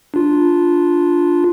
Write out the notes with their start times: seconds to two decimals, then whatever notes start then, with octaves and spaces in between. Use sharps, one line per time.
0.14 D4 F4